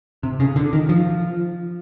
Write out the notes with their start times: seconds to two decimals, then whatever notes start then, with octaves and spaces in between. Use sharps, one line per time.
0.23 C3
0.40 C#3
0.56 D3
0.73 D#3
0.89 F3